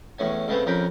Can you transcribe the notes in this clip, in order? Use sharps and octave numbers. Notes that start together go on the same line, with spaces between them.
E2 A2 C#4 G#5
C#3 G#3 A3 B3 C4
F2 C#3 A#4 G5 B5